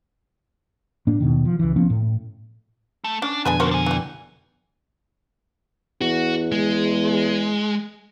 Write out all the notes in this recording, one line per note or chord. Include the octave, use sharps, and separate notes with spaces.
A2 A#3 D4
D#2 B2 D#3
F3
C#2 E3
F3 A#3 B3 C#4
A2
A3
C#4 D4
F2 B2 D3 G#3 D4 B4 G#5
A#3 C#4 F#4 A#4 C5
D4 G#5
E3 G3
E2 F#4
G#3